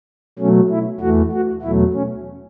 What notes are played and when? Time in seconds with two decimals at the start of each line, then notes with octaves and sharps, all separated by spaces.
0.39 B2 F#3 A3 C#4
0.70 E4
1.00 E2 E3 A3 F#4
1.32 F#4
1.62 E2 B2 F#3 A3 E4
1.93 C#4